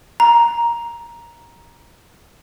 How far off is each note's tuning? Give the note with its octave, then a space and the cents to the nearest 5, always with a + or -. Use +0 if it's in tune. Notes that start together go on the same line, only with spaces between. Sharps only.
A#5 +10